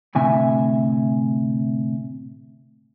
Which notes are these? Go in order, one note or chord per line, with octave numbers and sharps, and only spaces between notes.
D2 A2 C3 E5 G#5